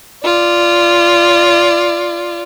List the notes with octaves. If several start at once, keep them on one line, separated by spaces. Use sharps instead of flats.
F4 D5